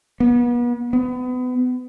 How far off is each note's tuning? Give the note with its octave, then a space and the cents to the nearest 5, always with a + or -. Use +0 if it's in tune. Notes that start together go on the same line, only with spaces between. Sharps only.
B3 -35
B3 +30